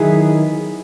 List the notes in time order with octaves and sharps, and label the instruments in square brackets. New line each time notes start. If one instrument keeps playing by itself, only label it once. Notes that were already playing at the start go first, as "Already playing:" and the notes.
Already playing: [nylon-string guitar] D#3 F#3 B3 E4 G#4